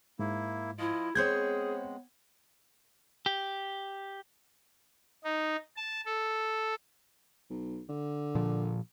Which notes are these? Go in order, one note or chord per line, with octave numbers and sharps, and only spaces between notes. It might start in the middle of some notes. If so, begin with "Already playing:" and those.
G#2 A#3 E4
F3 E4 F4 D#5
G#3 B3 C4 G#4 C5 C#5 G6 G#6
G4
D#4
A5
A4
B1
D3
A#2 F3